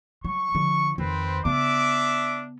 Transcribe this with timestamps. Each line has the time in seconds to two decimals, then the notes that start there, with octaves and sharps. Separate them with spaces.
0.25 F#3 C#6
0.55 D3 F3
0.98 F2 D#3 C4 B4 C5
1.45 C#3 B3 D4 E5 D6